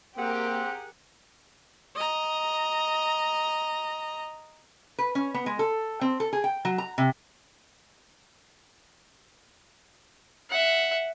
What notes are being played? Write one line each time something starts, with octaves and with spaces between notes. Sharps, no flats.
A#3 C4 G4 G#4 A#4 F#5
D#5 A#5
B4
C#4
B3
G#3
A4
C4
A4
G#4
G5
F#3
A#5
C3
E5 F#5